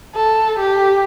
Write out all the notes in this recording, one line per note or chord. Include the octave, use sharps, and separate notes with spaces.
A4
G4